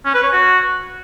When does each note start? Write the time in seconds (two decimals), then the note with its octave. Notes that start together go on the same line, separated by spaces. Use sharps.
0.05 C#4
0.14 B4
0.23 C#5
0.33 F#4